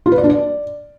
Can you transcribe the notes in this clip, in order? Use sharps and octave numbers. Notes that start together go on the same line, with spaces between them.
F4
B4
D5
D4
D5